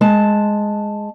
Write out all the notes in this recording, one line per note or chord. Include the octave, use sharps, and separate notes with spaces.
G#3 A5